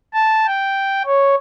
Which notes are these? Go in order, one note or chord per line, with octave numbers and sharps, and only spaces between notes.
A5
G5
C#5